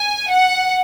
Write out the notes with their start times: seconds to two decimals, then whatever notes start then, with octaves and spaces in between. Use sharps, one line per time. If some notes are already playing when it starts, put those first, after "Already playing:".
Already playing: G#5
0.30 F#5